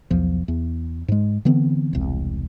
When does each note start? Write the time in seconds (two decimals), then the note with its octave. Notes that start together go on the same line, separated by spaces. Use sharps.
0.10 B1 E2 F3
0.48 E2
1.08 G#2 G#3
1.45 D3 E3 B3 C4
1.93 E1 C2